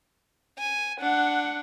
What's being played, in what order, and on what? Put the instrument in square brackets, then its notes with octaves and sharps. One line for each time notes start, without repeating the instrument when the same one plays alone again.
[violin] G#5
[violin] D4 [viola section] F#5